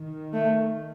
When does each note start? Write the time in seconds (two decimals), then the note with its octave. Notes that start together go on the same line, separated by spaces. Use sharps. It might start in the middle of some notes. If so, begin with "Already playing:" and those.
Already playing: D#3
0.34 A3